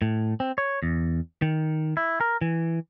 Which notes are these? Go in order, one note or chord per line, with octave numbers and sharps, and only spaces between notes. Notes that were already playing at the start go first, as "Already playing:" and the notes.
A2
C4
C#5
E2
D#3
E4
A#4
E3